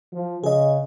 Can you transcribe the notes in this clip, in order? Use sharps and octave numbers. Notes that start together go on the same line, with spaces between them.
F3
C#3 G#4 D#5